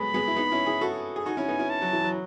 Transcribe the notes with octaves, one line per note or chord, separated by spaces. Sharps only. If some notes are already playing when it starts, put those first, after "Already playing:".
Already playing: F#3 G#3 A3 B3 B5
G#3 B3
E4
B3 D#4
C#4 E4
E4 G#4
F#4 A4
G#4
D#4 F#4 G#5
C#4 E4
B3 D#4
C#4 E4
A5
F#3
E3
F#3